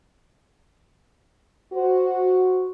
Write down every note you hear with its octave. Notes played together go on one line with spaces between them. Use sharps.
F#4 C5